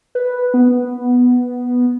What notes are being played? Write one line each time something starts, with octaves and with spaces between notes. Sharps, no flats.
B4
B3